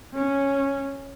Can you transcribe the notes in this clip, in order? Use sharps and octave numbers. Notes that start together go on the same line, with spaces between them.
C#4